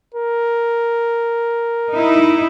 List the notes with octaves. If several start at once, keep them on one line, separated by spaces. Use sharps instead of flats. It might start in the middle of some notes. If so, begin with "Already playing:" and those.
A#4
D#4 E4